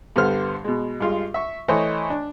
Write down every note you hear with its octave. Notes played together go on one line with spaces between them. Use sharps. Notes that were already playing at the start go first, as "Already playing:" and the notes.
G2 D3 B3 C5 F6
B2 G#3
G2 G#3 F4
E5 C#6
E3 A3 C5 C#5 D#5
D4